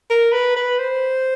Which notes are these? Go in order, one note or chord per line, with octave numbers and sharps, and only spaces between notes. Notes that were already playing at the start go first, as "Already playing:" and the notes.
A#4
B4
B4
C5